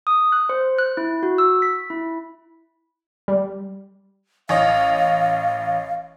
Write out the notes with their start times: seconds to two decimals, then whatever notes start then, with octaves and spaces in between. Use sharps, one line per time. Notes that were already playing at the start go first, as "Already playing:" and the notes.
0.07 D#6
0.32 F#6
0.49 C5
0.78 F#6
0.97 E4
1.23 F#4
1.38 E6
1.62 B6
1.90 E4
3.28 G3
4.49 A1 C#5 D#5 F5